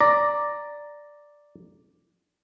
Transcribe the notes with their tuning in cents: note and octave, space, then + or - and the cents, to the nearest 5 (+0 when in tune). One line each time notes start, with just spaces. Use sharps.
D5 +0 A#5 +0